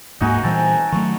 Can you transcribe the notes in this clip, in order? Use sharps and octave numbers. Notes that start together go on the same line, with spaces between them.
D1 G#2 A#3 D#4 F#4 G#4
A#2 E3 G3 C4 G#5 A5
D#3 F#3 A3 C#6